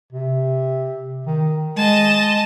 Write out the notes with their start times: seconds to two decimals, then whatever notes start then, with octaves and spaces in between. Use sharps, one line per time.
0.12 C3
1.27 D#3
1.77 G#3 D#5 A5